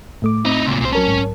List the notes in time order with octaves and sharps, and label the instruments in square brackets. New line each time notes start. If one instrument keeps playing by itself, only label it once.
[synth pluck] A2 A3 D6
[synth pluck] C4 [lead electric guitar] D#4 E4
[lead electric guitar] C#2 A#2
[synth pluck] C2 [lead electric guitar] A#2 C5
[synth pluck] F#3 A#4 A5 [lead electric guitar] C#4
[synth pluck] A#1 G#2